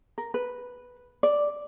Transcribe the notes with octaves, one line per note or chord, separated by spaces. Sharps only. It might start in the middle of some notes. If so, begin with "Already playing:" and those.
A#4
B4
D5